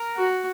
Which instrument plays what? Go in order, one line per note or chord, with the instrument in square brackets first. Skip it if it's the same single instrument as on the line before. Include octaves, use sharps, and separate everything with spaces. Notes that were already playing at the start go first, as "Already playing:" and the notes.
Already playing: [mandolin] A#4
[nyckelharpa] F#4